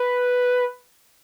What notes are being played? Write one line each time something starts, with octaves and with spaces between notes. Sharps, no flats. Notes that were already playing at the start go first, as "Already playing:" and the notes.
Already playing: B4